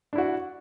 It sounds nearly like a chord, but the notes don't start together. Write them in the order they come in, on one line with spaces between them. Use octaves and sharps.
D4 E4 F#4